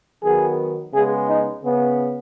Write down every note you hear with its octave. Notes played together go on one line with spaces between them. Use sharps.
D#3 F#3 B3 G#4
C#3 G#3 B3 G#4
D#4
C#3 B3